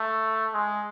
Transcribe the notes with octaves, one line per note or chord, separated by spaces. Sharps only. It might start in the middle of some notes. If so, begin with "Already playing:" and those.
Already playing: A3
G#3